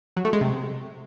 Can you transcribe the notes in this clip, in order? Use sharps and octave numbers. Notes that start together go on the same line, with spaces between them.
F#3
A3
G#3
C3